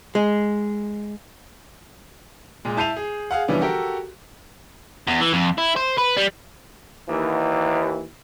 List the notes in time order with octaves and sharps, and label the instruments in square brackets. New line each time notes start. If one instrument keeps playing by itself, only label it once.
[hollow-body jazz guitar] G#3
[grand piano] A#2 G#3
E4 A5 G6 C7 D#7 F7
G#4
G#4 F5 F#5
D3 E3 F3 G3 B3 C#4
F#4 G4 A4 A#4
[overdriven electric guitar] E2
E3
F2
E4
C5
B4
G3
[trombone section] D#2 E3